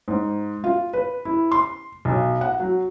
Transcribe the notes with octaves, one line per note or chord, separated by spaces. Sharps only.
G#2
F4
B4
E4
C6
B1
F#5
F#3